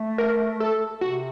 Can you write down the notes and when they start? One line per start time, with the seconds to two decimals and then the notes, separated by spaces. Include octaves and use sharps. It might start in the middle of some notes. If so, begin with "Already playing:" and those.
Already playing: A3
0.18 A#4
0.60 A4
1.01 C3 F#4